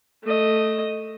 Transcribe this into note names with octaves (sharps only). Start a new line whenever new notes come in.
A3 D#5